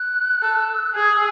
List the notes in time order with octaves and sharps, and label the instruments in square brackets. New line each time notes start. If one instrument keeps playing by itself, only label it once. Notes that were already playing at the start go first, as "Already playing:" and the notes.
Already playing: [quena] F#6
[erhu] A4
[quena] E6
F#6
[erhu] G#4 [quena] G#6
[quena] E6